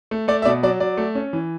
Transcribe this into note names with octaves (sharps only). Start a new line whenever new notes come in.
A3
A3 D5
E5
B2 D5
F#3 D5
F#3 D5
A3
C#4
E3